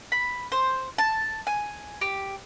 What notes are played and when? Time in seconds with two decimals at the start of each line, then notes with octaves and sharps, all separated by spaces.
0.12 B5
0.52 C5
0.98 A5
1.47 G#5
2.01 G4